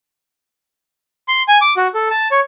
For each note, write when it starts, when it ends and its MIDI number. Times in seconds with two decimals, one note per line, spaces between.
1.28 1.42 84
1.48 1.58 80
1.61 1.73 86
1.77 1.88 66
1.94 2.09 69
2.10 2.28 81
2.31 2.40 73